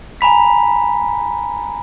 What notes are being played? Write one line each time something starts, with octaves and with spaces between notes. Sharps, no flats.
G#5 A#5 B5 B6